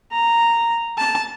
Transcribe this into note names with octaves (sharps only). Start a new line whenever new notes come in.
A#5
A5